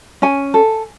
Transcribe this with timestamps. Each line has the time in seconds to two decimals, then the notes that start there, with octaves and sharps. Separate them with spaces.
0.22 C#4 G#5
0.54 A4